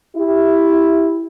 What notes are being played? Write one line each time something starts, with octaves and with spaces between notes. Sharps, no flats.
E4 G4